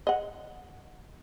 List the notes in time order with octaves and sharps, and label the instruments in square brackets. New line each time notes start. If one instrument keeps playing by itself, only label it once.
[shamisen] D#5 F#5